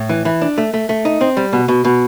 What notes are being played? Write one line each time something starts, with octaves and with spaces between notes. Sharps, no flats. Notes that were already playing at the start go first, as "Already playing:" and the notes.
Already playing: A2
E3
E3
D4
A3
A3
A3
D#4
C4
G3
B2
B2
B2